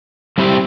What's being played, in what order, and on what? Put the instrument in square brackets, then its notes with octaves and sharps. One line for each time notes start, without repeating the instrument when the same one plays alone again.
[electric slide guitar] G3 C4 E4 G4